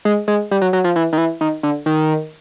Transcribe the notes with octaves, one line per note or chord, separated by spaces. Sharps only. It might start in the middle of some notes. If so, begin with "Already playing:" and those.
G#3
G#3
G3
F#3
F#3
F3
E3
D#3
E3
D#3
D3
D#3